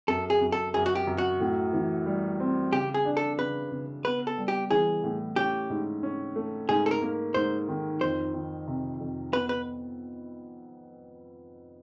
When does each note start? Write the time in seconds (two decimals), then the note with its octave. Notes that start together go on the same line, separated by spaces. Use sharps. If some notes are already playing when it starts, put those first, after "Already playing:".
0.08 F#2 A4
0.30 G#4
0.41 F#2
0.52 A4
0.74 F#2 G#4
0.86 F#4
0.95 G4
1.07 F#2
1.18 F#4
1.40 A2
1.73 E3
2.06 G3
2.40 C4
2.72 C#3 G4
2.94 G#4
3.05 D4
3.17 A4
3.38 C#3 B4
3.72 C#3
4.05 B3 B4
4.27 A4
4.38 G3
4.48 G4
4.71 E3 G#4
5.04 A2
5.36 C#4 G4
5.70 G#2
6.03 C#4
6.36 A3
6.69 G#2 G#4
6.86 A4
6.91 A#4
7.02 A#3
7.34 G#2 C5
7.69 D#3
8.01 F2 C5
8.34 D#3
8.67 C3
9.00 F2
9.33 B3 B4
9.49 B4